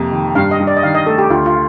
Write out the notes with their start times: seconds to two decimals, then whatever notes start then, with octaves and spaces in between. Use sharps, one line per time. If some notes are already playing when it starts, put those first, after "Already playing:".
Already playing: F2 C3 A#3
0.12 D#3
0.35 G2 F5
0.51 D#5
0.60 G2
0.67 D5
0.77 D#5
0.83 D#3 F5
0.95 D#5
1.06 A3 A4
1.18 G4
1.30 D2 F4
1.46 F4